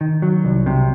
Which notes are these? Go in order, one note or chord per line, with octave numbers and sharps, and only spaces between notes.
D#3
F#3
C2
C3